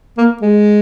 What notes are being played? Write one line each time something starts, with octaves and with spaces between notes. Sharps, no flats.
A#3
G#3